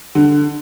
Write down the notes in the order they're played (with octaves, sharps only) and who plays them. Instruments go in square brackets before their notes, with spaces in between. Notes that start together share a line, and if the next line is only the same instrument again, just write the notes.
[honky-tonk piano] D3